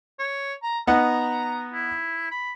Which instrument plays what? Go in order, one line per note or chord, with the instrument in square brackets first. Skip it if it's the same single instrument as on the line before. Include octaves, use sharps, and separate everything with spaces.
[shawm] C#5
A#5
[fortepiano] B3 D#4 F#5 [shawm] A#5
[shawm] E4
B5